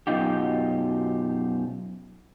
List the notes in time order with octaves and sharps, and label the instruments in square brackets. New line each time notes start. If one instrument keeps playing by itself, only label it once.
[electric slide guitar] F#2 B2 D#4 F4 G4